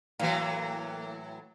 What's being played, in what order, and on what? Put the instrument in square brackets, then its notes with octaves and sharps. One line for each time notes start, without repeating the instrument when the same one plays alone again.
[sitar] A2 E3 F#3 [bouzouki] A#3